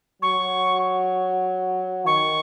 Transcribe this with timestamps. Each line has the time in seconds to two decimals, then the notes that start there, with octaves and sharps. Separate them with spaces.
0.22 F#3 C#6
2.06 D#3 C#6